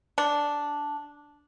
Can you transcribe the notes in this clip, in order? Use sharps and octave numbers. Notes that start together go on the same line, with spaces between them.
D4